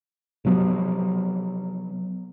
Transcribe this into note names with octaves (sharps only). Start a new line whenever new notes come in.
C3 F3 F#3 B3